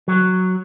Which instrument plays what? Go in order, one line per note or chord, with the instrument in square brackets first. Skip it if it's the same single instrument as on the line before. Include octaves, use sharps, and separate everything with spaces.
[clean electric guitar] F#3